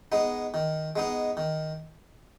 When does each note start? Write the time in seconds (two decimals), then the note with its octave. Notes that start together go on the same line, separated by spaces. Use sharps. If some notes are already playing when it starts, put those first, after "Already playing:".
0.12 G#3 B3 D#4
0.54 D#3
0.96 G#3 B3 D#4
1.37 D#3